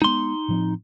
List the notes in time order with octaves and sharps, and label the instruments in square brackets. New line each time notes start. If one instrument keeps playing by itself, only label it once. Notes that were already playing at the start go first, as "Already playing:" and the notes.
[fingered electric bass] G#3 B3 [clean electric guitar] D#4 C6
[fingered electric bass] A2 F3 C4